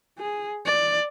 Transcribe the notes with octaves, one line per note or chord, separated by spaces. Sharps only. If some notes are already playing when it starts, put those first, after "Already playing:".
G#4
D5